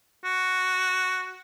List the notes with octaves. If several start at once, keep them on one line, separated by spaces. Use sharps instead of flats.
F#4